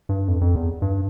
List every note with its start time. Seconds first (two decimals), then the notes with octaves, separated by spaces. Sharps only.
0.09 G2
0.28 F2
0.41 F2
0.56 E2
0.82 G2